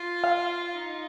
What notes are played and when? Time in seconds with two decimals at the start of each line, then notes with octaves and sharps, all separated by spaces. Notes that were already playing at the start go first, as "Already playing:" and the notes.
Already playing: F4
0.24 F5
0.72 D#4